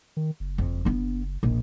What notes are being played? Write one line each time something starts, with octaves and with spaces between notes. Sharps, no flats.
D#3
F#1
F2
B3 D4
D#1 A#1